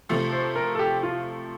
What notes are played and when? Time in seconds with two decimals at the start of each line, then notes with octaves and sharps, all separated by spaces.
0.09 C3 F3 A3
0.33 C5
0.56 A#4
0.75 A4
0.79 G4
1.03 F4